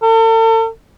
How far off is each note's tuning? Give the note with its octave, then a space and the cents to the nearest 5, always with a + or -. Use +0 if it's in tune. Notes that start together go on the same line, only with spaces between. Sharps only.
A4 +40